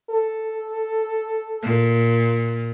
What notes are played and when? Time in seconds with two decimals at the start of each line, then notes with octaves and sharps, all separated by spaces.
0.10 A4
1.62 A#2